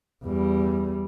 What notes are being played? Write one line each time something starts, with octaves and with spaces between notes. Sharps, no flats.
E2 G3